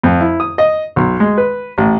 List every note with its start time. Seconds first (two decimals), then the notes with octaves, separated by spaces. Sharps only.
0.03 F2
0.20 E4
0.40 D#6
0.58 D#5
0.96 B1
1.20 G#3
1.38 B4
1.78 A1